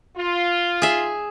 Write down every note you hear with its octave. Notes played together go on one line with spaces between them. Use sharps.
F4
G#4 E5